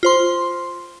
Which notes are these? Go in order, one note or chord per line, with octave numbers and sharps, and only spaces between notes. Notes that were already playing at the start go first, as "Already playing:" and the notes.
F4 C5 C6